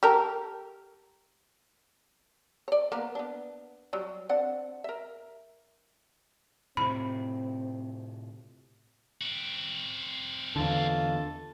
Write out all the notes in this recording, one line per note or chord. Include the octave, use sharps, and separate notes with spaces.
G4 A4 A#4
C#5 D5
A#3 B3 A#4
B3 D4
F#3 G3
C4 D4 F#5
A#4 E5
A2 C3 C4 B5
C4 F#4
E2 D3 F4 A4